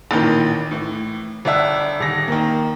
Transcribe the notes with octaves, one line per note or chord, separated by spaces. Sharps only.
A1 A#2 D#3 E3
A2 E3
G1 D4 E5
D#1 A#6
D#3 A#3